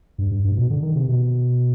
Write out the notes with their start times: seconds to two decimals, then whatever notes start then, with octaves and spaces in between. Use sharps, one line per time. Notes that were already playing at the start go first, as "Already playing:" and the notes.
0.18 G2
0.31 G2
0.44 G2
0.52 G#2
0.57 B2
0.70 D3
0.82 D#3
0.95 C3
1.08 B2